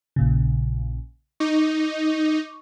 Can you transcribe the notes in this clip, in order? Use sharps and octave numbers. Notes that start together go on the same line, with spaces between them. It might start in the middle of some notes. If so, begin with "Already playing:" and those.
A#1 A#2 C#3
D#4 C#6 D6